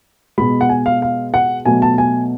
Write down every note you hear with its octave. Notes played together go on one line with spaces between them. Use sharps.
B2 G#3 B5
F#5
G#5
F5
F5
F#5
B2 F#3 A3 G#5
A5
G#5